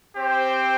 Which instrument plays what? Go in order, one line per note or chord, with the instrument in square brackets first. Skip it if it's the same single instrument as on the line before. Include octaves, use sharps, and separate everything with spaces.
[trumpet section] C4 G4 C5 G5